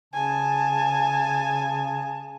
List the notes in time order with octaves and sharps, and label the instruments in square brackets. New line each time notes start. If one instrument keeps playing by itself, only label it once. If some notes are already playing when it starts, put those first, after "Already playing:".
[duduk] C#3 [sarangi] G#5 [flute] A5